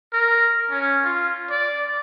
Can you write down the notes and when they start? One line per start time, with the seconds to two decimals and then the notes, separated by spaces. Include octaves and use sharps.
0.13 A#4
0.70 C#4
1.04 F4
1.51 D5